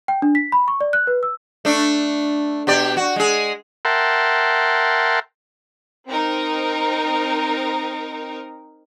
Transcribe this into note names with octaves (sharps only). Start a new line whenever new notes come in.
G5
D4
B6
B5
C#6
D5
F#6
B4
E6
A3 D4
B2 G4 D5
F#4
G#3 G#4
A#4 E5 F#5 G5 A5 C6
C4 D#4 A#4